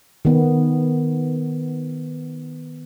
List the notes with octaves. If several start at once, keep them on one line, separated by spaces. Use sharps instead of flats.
D#3 B3